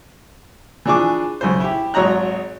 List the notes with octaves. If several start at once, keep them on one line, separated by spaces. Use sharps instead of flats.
E3 F3 D4 G#4 C#6 D6
B1 C#3 C5
E4 G4
G#1 F#3 C#5 D#5 A#5 F#6